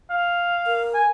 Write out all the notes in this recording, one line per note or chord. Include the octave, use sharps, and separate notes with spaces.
F5
A#4
G#5